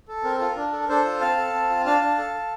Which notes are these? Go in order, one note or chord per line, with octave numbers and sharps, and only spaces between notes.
A4
C4 A#4
F4 A4
A#4
D4
A4
D4 A4 C5
F4
C4 F5 A5
A4
C4
F4
D4 F5 A5
D4
A4
A4